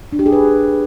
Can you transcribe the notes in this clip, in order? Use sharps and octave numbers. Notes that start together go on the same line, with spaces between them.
D4
G4
G#4
B4